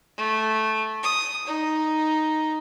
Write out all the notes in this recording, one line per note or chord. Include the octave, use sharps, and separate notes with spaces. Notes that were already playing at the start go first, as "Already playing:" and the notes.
A3
D#6
D#4